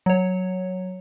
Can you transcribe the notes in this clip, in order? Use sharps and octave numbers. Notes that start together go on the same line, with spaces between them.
F#3 C#5